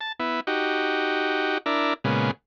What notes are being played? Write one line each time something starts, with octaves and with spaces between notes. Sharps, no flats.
A5
B3 E4
D#4 F#4 G4
D4 E4 A#4
A#2 C#3 G#3 B3